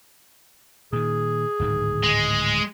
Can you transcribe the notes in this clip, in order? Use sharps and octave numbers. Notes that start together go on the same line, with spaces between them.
A#2 D#3 G#4
D1 G#2 D#3
G#3